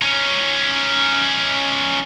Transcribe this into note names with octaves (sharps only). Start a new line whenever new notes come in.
C#4 D#4